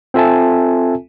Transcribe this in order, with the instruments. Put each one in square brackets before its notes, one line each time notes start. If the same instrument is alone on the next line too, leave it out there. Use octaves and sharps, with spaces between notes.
[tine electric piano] C4 F4 A4 E5 G#5 A5